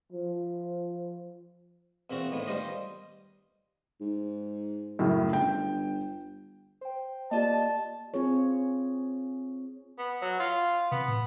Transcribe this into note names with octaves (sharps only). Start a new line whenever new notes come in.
F3
E2 A#2 C4 F#4
A2 D#3 B3
D#3 G3 F4 G4 C5 D#5
G#2
F#2 A2 C#3
G1 G5
C5 G5
A#3 F4 G4 D5 D#5 A5
C4 F4 G#4 C#5
B3
F#3
F4
C3 B3
A2